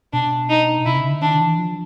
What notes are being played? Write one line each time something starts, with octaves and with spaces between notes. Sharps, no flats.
B2 D4
D#4
C3 E4
C#3
D3
D#3 D4
E3
F3